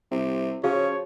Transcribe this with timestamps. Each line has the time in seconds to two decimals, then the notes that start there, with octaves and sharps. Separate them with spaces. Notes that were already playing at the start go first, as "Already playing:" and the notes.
0.11 C2 C3
0.64 C#3 F3 F#4 G#4 C#5 F5